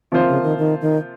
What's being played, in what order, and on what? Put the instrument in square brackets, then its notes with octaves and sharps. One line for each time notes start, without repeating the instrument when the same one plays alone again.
[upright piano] C3 F3 A#3 F4 C5 [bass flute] D#3
[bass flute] C#3
D#3
D#3
D#3